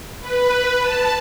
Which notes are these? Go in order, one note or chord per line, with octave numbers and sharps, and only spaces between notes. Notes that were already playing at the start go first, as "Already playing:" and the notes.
B4
A5